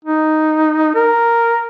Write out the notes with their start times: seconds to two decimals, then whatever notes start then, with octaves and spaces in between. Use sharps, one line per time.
0.05 D#4
0.95 A#4